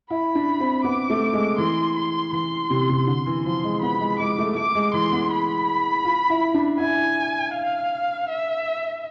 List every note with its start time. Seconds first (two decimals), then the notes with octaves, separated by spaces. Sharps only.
0.10 E4 B5
0.35 D4
0.60 C4
0.84 B3 D6
1.10 A3
1.33 G#3
1.58 E3 C6
1.96 C6
2.33 E3 C6
2.70 C3
2.89 C3
3.07 D3 C6
3.26 E3
3.45 F3 C6
3.64 G#3
3.82 B3 B5
4.00 G#3
4.19 G#3 D6
4.38 A3
4.56 A3 D6
4.75 G#3
4.93 E3 C6
5.12 B3
5.31 B5
6.05 F4
6.30 E4
6.54 D4
6.80 E4 G#5
7.54 F5
8.29 E5